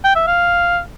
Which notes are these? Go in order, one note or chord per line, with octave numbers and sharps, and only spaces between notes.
G5
E5
F5